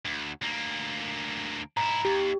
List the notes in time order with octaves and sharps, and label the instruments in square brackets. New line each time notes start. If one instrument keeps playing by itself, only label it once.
[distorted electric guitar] D2
D2 A#3
[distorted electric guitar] G#2 E4 [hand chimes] A#5
[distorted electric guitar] D#2 [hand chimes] G4